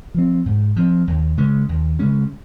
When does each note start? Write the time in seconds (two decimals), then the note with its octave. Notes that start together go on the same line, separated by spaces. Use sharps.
0.14 F3 C4
0.46 G#2
0.76 F3 C4
1.07 D#2
1.38 C#3 G#3 C#4
1.69 D#2
1.99 C#3 G#3 C#4